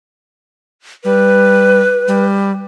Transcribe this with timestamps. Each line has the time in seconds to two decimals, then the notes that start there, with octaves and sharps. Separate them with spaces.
1.05 G3 B4
2.08 G3